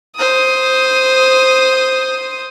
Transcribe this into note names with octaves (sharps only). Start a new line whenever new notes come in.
C5 D#6